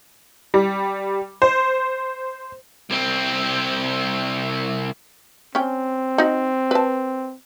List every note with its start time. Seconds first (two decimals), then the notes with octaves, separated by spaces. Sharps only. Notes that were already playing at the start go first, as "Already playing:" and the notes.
0.54 G3
1.42 C5
2.90 C2 C4
5.55 C4 C#4 G5
6.18 D#4 F#4
6.71 B4 A5